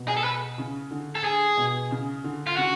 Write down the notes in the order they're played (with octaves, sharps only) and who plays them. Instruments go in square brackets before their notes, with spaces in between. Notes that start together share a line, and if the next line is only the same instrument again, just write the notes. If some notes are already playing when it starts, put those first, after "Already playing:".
Already playing: [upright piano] B2
[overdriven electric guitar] G#4
A4
B4
[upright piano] C#3
D3
[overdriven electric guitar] A4
G#4
[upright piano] B2
C#3
D3
[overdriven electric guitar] F4
[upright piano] C#3 [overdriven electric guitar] F#4